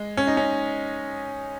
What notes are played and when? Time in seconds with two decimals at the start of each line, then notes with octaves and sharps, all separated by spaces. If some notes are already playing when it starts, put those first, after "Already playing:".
Already playing: G#3
0.17 C#4
0.27 D#4
0.37 C#4